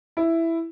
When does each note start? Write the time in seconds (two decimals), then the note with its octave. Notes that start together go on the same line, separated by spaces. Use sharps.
0.17 E4